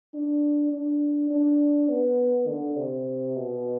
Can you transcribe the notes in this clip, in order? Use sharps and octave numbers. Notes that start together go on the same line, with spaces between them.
D4
D4
D4
B3
D3
C3
B2